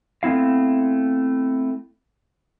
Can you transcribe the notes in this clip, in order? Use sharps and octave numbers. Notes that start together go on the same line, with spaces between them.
A3 B3 C4 E4 F5